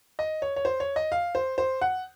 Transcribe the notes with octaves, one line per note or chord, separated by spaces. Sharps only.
D#5
C#5
C#5
C5
C#5
D#5
F5
C5
C5
F#5